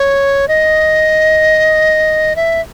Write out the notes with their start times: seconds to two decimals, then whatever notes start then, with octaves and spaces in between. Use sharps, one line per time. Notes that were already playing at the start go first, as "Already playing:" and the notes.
Already playing: C#5
0.48 D#5
2.36 E5